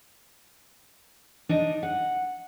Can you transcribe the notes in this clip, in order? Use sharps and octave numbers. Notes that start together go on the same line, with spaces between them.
D4 D#4 D#5
F#5